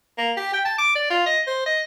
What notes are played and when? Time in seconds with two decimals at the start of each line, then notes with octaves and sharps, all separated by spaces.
0.18 A#3
0.37 G4
0.53 G5
0.65 A5
0.78 D6
0.95 D5
1.11 F4
1.26 D#5
1.47 C5
1.66 D#5